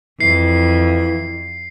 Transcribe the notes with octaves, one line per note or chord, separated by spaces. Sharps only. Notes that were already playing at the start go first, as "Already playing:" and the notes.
F2 E3 C7